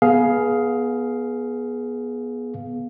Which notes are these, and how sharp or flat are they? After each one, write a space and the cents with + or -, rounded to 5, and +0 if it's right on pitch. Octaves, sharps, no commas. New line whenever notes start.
B3 -20 G#4 +15 F5 +0